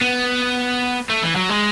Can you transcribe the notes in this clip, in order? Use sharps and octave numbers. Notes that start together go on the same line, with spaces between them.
B3
A3
E3
F#3
G#3